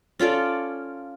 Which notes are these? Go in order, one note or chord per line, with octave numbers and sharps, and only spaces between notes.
C#4 F4 A4 D5